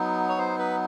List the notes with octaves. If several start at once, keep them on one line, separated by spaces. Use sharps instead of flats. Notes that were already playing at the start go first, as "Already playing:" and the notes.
Already playing: F#3 B3 D#4
C#5
C5
B4